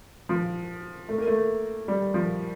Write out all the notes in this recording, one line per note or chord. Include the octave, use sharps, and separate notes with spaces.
F3
A3
A#3
A3
G3
F3